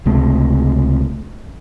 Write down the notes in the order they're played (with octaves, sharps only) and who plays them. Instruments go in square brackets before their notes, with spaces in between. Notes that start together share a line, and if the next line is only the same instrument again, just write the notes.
[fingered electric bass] C#2 C3 A3